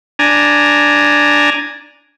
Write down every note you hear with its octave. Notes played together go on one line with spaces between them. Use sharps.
D4 G#5 A#5